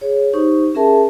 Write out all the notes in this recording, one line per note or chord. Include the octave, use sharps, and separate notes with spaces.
G#4 C#5
D#4 G4 C5 C#6
C#4 G#4 A#4 E5 A5